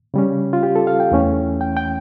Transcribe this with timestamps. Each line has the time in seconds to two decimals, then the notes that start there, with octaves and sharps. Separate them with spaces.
0.14 C#3 G3 C#4
0.53 F4
0.63 G4
0.76 A4
0.87 F5
1.00 G5
1.12 E2 E3 A3 C#4
1.61 G5
1.77 G5